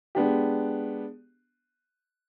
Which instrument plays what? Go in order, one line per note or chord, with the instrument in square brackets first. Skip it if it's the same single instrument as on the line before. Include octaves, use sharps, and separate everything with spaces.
[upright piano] G#3 B3 D4 G4